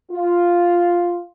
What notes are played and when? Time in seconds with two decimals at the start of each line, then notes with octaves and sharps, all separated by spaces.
0.12 F4